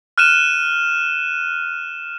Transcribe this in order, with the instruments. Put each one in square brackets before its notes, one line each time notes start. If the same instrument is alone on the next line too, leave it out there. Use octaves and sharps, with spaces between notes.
[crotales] F6 F#6 D#7 E7